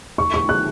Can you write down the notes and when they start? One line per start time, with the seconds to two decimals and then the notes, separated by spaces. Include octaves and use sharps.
0.18 C#6
0.34 C#6
0.49 F#6